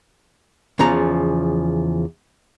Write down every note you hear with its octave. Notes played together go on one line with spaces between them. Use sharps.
E2 C#3 F3 A#5